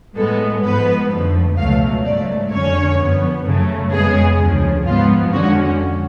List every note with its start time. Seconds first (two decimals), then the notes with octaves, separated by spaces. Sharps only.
0.16 A2 G#3 B3 A4
0.63 G#2 F3 B3 B4
1.10 F2 D3 F3 A3
1.57 C#2 B2 F#3 A3 F5
2.04 G#2 F#3 A3 D5
2.51 F2 D3 F#3 C#4 C#5
2.98 F#2 F3 B3
3.44 F#2 C#3 F#3 A3
3.91 F2 C#3 G#3 B3 G#4
4.39 D2 C#3 F3
4.85 G#2 F3 B3 F4
5.32 F2 D3 G#3 C#4 F#4